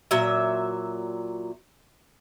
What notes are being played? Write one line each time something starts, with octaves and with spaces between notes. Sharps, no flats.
A#2 F#3 E5